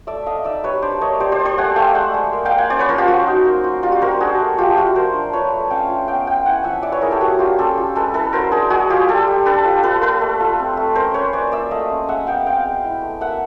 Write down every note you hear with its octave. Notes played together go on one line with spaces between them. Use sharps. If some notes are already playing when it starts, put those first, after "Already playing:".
A3 D5 E5
A3 D#5 F5
D#4 D5 E5
G3 B4 C#5
D4 C5 D5
A#3 C#5 D#5
G3 C5 D5
C5 D5
G3
C5 D5
A3 F#5 G#5
A3 F5 G5
G#3 E5 F#5
G#3
A#3
F5 G5
A#3
F#5 G#5
C#4 C5 D5
B4 C#5
F3 A#4 C5
F4 G4
F#3 F#4
D#4
A#3
F4
G3 F4
F#4
G3 A#4 C5
D4 F#4 G#4
A3
F3 F4 G4
F3 F#4
F4 A#4 C5
D4
F4 B4 C#5
A3
C#4 F5 G5
F4
B3 F5 G5
B3 F5 G5
E4 F#5 G#5
F3 E5 F#5
E4 D5 E5
B4 C#5
E4 G#4 A#4
G4 A4
A#3 F#4 G#4
D4 F4 G4
C#4 G4 A4
F4
G#3 A4 B4
E4 A4 B4
F#3 A#4 C5
D4 G#4 A#4
G#3 F#4 G#4
G#3 F4 G4
G3 G4 A4
G3
D4 A4 B4
F4
F4 A4 B4
A#3 A4 B4
A3
F4
C4
A3
C#4 A#4 C5
C#4 B4 C#5
A#3 C5 D5
A#3 D5 E5
A3 D#5 F5
C#4
G#3 E5 F#5
B3 F5 G5
C4 F5 G5
G#3
E4
A3
A#3 E5 F#5